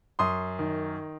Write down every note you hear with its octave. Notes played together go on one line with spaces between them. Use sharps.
F#2 C6 D#6
D#3